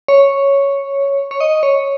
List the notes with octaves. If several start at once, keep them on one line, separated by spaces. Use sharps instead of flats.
C#5
C#5
D#5
C#5